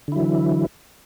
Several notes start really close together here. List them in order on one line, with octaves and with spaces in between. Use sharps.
D3 E4 F#3 E3